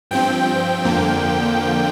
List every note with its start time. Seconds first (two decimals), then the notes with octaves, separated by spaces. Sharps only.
0.11 G2 F3 C4 G5
0.84 F2 D3 F3 A#3